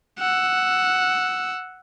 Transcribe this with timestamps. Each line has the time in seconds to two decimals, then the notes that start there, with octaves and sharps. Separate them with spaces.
0.19 F#5 E6